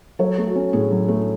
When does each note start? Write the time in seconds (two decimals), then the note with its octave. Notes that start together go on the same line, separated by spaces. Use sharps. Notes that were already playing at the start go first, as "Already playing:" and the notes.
0.19 F#3 A4 C#5
0.38 A3
0.47 F#4
0.55 C#4
0.73 A2 G#4
0.91 F#3
1.08 A3